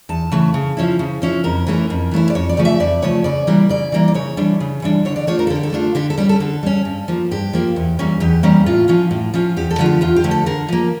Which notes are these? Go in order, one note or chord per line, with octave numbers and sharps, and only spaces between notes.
E2 A5
C#3 E3 A3
C#3
F3 C#4 E4
C#3
F3 C#4 E4
F2 A#4
E3 A3 C#4 E4
F2
E3 A3 C#4 E4
D5
F2 C#5
D5
C#3 F3 A3
E5
F2 D5
C#3 F3 A3 C#5
C#3 D5
E3 G3 A#3
C#3 D5
E3 G3 A#3
D5
C#3 C#5
E3 G3 D4
C#3
E3 G3 D4
D3 C#5
D5
A3 D4 F4 C#5
A#4
A4
D3 G4
A4
A3 D4 F4
D3 G4
A4
G3 C#4 G4
A4
D3 A4
G3 C#4
G2
F3 A#3
G2 G4
F3 A#3
E2
E3 G3 A#3 C#4
E2 G4
E3 G3 A#3 C#4
A2 F4
F3 C#4 F4
A2
F3 C#4 F4
E2 G4
A4
D3 F3 A3 F4
G4
E2 F4
G4
D3 F3 A3
A4
D3 A#4
F3 A#3